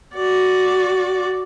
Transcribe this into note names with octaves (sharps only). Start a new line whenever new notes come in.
F#4 D5